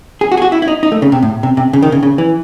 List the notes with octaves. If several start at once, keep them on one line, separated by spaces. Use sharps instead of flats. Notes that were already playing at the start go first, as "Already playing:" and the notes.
G#4
F#4
G#4
F#4
E4
E4
D#4
D#4
A3
C#3
C3
A2
C3
C3
C#3
D#3
C#3
C#3
E3